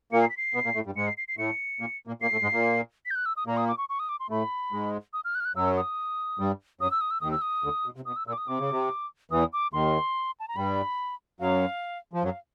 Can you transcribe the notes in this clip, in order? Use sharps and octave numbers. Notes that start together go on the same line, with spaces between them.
A#2 A#3 C#7
C7
B6
C7
B2 B3
A#2 A#3
A2 A3
G2 G3
G#2 G#3 C#7
C7
C7
C7
A2 A3 C#7
A#2 A#3
A#2 A#3
A#2 A#3 C7
A2 A3
G#2 G#3
A#2 A#3
B6
G6
F#6
E6
D#6
A#2 A#3 A#5
D#6
D6
C#6
C#6
D#6
D6
C6
A2 A3 B5
G#2 G#3
D#6
F6
F#6
F6
F#6
F#2 F#3 E6
D#6
G2 G3
F#2 F#3 D#6
E6
D#6
E6
D#2 D#3 D#6
E6
D#6
D2 D3
B2
C3
B2 D#6
E6
A#2 E6
D6
D#6
C3 D6
C#3
C3
E2 E3 D#6
D6
D#2 D#3 C6
A5
A#5
G2 G3 B5
F#2 F#3 F5
F3
F#2 F#3 F5